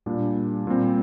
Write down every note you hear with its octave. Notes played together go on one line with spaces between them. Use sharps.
A#2 G3 D4
A#2 G3 C4